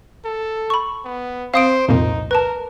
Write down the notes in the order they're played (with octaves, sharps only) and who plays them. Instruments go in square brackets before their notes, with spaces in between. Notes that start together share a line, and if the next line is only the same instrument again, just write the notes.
[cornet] A4
[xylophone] B5 C#6
[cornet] B3
[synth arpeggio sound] C4 [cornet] C5 [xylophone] F5 D#6 D7
[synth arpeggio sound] C2 F2 A#2 [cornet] D#4
[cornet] A#4 [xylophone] B4 A5